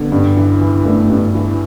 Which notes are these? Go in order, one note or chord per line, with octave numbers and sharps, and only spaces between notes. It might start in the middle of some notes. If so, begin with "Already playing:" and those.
Already playing: D3 B3
G2
E3
E3
G2 A3
G2
E3